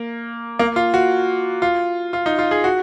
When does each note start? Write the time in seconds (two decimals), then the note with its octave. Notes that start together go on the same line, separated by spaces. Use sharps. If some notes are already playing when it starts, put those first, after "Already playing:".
Already playing: A#3
0.59 A#3
0.76 F4
0.94 F#4
1.62 F4
2.13 F4
2.26 D#4
2.39 F4
2.51 G#4
2.64 F#4